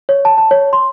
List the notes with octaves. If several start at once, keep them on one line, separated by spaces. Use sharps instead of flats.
C#5
A5
A5
C#5
C6